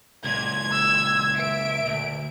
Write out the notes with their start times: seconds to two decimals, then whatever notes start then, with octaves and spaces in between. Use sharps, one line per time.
0.24 C#2 A#2 G#6
0.72 E6
1.37 E5 D7
1.87 D2